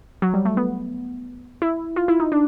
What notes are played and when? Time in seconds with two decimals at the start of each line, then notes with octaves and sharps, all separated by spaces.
0.22 F#3
0.34 G3
0.45 A3
0.57 B3
1.62 E4
1.96 F4
2.08 E4
2.20 D#4
2.32 D4